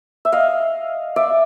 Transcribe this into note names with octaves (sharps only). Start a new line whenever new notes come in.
E5
D#5 F5
D5 E5